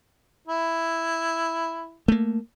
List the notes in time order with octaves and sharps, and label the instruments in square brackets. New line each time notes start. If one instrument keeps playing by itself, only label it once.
[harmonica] E4
[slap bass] A3 A#3